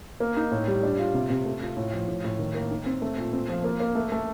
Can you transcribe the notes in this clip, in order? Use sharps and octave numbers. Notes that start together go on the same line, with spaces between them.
A#3
D#4
A2
G3
D4
F4
C3
C3
A3
F4
A2
F3
A2
A2
D#3
A#3
D#4
C4
A3
A#2
C4
F3
A#3
A#3
A3
A3